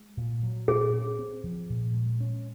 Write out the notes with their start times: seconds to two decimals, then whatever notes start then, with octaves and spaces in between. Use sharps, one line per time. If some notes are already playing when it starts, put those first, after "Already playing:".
Already playing: G#3
0.17 A#2
0.43 F#3
0.68 A#2 G#4
0.93 C#4
1.19 C4
1.44 F3
1.70 A#2
1.94 G#3
2.20 C#4